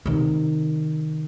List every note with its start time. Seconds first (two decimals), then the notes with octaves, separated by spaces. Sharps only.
0.06 C3 D#3